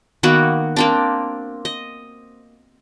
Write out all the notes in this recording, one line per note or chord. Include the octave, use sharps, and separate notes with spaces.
D#3 A#3 B3 F#4
A#3 C4 D4
D#5